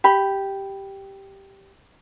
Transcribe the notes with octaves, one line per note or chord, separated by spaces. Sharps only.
G4 B5